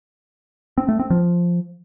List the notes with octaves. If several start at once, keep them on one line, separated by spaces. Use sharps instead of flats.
C4
A3
C4
F3